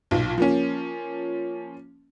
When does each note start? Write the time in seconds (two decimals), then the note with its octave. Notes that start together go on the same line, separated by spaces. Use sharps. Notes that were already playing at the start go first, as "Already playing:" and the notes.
0.11 B1 A#2
0.38 F3 A#3 C#4